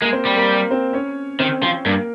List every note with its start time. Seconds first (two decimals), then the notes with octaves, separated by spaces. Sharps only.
0.02 G#3 A#3 A#4
0.13 C4 C5
0.25 G3
0.37 A#3 A#4
0.71 C4 C5
0.93 C#4 C#5
1.39 D#3 C4 C5
1.62 F3 C4 C5
1.85 G2 A#3 A#4